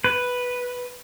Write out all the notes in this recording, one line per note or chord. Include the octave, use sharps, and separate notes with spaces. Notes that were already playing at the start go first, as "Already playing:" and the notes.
B4